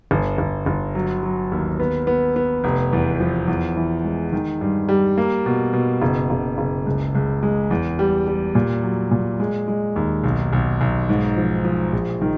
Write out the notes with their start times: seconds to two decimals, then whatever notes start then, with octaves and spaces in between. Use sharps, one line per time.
0.11 G1
0.38 G1
0.66 G1
0.95 F#3
1.23 F#3
1.52 D#2
1.80 B3
2.07 B3
2.36 B3
2.64 F1
2.93 E2
3.20 F3
3.48 E2
3.77 E3
4.04 G#3
4.33 D#3
4.61 G2
4.89 G3
5.18 A#3
5.46 B2
5.73 B2
6.02 F#1
6.30 F#1
6.58 F#1
6.86 C#2
7.15 C#2
7.43 G#3
7.71 E2
7.99 G3
8.27 G3
8.55 A#2
8.83 F#3
9.11 A#2
9.40 G#3
9.68 G#3
9.96 D#2
10.24 B1
10.53 B1
10.81 B1
11.09 G#2
11.37 F3
11.65 F3
11.93 A#1
12.22 D#3